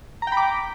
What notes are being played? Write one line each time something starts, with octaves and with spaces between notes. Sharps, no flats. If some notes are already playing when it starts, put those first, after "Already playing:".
G5 A#5 B5 D6